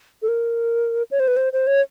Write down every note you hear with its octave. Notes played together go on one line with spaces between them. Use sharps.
A4
A#4
C#5
C5
B4
C5
C5
C#5